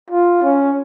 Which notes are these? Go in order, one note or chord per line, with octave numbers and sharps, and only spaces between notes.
F4
C#4